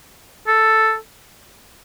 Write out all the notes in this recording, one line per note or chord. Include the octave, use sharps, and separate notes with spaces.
A4